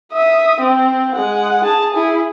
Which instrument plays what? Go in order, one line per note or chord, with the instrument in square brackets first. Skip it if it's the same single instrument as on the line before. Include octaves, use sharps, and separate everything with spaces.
[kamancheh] E5 D#6
C4
G#3 F#5
G#4 A5
E4 G#4